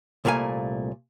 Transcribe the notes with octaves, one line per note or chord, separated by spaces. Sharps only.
C2 A#2 A3 F5 G#5